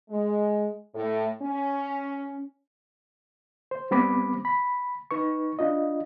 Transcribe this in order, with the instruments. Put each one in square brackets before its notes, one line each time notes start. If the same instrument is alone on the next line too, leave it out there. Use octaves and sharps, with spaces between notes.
[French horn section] G#3
A2
C#4
[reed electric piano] C5
G3 B3 C4 B5 D6
B5
D#4 B4 C#6
D4 F4 D#5